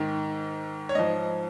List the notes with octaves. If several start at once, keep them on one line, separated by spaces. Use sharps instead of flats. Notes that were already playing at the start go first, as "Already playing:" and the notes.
Already playing: G#2 D#3
C#5
G#2 F3 D#5